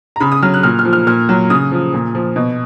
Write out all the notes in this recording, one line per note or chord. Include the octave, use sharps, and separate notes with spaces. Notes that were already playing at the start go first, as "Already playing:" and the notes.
A#5
C#3 B5
D#6
F#3 F6
F#6
A#2 F6
F6
F3
F6
A#2 F6
F#3
C#3 D#6
F3
A#2
F3
B2